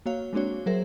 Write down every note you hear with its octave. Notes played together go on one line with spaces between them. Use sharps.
A#3 F#4 C#5 F5
G#3 A#3 C4 D4 F#4 C#5
F#3 G#4 A#4 C5 E5